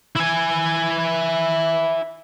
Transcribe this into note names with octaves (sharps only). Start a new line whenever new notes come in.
E4 G#5